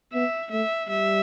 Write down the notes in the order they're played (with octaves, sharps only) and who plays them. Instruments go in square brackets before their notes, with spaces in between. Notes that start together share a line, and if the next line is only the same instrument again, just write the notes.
[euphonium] B3 [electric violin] E5
[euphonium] A3 [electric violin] E5
[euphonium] G3 [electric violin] E5